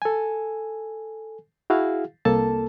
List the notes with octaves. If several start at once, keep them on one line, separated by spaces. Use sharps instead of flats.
A4 G#5
E4 F#4 G#4 F5
C2 A#3 A4 A5